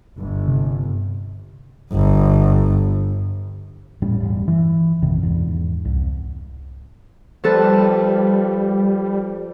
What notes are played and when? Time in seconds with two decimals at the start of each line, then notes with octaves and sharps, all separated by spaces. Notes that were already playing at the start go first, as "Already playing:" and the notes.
0.18 G1
0.48 C3
1.93 G1
4.02 E1 A2 G3 C#4
4.20 E1 G2
4.48 E3
5.02 A1 F2 C3 D#3
5.23 E2 G#2
5.85 C2
7.44 F3 G3 A4 B4